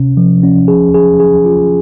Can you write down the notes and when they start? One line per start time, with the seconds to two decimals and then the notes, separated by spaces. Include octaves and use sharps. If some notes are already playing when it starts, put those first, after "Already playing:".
Already playing: C3 C#4
0.17 F3
0.43 C#4
0.68 G#4
0.95 G#4
1.20 G#4
1.45 F4